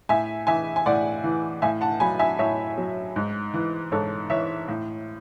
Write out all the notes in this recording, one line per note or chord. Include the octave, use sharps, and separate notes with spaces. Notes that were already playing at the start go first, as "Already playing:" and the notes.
A2 E5 G#5
E3 E5 G#5
G#5
A2 D5 F#5
E3
A2 E5 G#5
F#5 A5
F#3 G#5 B5
E5 G#5
A2 C#5 E5
F#3
G#2
E3
G#2 A4 C#5
E3 C#5 E5
A2